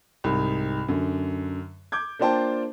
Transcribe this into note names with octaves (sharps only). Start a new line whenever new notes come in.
C2 G#2
F#2 D3
D6 G6 G#6
A#3 D4 F4 C5 G5 A5